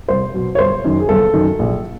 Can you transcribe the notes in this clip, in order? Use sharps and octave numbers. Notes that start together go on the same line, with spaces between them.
C2 C5
B2 F#3
C#5
G1 C5
F#2 D#3
G#4
G1 A4
F#2 D#3
A#1